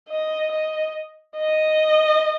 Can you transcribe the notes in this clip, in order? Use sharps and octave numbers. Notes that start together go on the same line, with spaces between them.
D#5
D#5
D#5